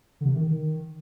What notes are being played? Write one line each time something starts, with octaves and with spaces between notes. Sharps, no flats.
D3
C3
D#3
D#3